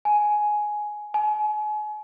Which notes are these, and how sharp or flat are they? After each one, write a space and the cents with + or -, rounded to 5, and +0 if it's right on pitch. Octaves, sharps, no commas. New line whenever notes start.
G#5 +10
G#5 +35